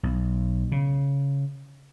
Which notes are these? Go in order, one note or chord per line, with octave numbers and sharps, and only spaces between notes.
B1
C#3